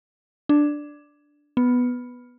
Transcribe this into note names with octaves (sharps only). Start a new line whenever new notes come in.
D4
B3